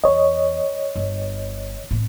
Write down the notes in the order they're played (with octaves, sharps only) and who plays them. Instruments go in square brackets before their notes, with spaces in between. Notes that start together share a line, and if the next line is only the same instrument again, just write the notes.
[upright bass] E2 [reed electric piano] C#5 D#5
[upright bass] G1
A2 C4